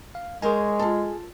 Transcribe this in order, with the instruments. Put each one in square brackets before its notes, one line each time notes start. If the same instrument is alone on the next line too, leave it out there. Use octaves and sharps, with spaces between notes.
[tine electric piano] F5
[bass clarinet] G#3 [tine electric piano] G#4 G#5 [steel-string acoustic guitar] A#4 C5 C#5
[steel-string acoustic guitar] F4 A4